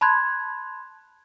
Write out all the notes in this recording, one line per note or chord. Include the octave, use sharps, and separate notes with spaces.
A5 B5 C6 F#6 G#6